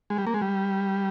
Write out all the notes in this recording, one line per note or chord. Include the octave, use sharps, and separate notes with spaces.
G#3
G3
A#3
G#3
G3